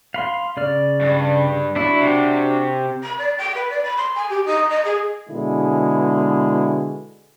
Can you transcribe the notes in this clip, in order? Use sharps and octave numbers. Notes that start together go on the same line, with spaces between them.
F5 B5 C6
C#3 D5 F6
G2
D4 E4 F#4
C3
B5
D5
G5
B4
D5
B5
C6
G#5
G4
D#4
D#5
G#4
B2 D3 G#3 E4